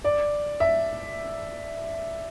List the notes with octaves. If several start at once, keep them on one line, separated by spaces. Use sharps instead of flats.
D5
E5